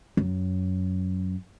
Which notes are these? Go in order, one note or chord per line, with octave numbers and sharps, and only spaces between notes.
F#2